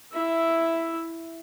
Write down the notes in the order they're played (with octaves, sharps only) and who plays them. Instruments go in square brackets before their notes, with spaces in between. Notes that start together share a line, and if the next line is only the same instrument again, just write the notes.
[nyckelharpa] E4 E5